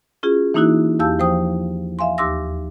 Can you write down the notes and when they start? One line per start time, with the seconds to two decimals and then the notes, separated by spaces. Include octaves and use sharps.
0.23 C#4 F4 F#4 G#4
0.54 E3 A#3 D#4 E4 F#4 F#6
0.99 E2 G4 F5 A5 E6 G6
1.19 F3 C5 G5 D#6
1.99 E5 F5 G#5 C6
2.18 D#2 G4 C6 D6 E6 A#6